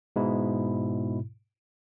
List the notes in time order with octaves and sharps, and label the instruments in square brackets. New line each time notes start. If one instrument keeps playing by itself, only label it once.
[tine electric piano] G#2 B2 E4